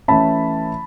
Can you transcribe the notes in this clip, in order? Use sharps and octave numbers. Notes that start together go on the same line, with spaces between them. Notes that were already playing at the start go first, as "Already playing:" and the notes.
E3 A3 C#4 A5 B5